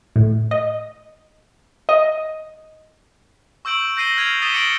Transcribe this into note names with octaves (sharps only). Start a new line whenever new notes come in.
A2
D#5
D#5
C#6 E6 G6 D7 F#7
G6 A#6 C7 D#7 G7
F6 G6 G#6 C7 D#7 F7
D#6 A6 B6 D#7 E7 G7
D6 A#6 C#7 D7 F#7 G7